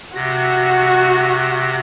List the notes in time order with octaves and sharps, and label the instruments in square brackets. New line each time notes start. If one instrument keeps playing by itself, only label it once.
[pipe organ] C3 A#6 [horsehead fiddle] F#4